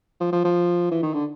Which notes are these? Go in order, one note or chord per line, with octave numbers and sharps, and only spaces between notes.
F3
F3
F3
E3
D#3
D3